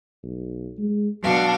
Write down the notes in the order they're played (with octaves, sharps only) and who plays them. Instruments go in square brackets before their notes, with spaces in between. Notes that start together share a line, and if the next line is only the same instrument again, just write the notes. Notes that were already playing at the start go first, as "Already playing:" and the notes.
[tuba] B1
G#3
[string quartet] B2 D4 F5 [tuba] F#3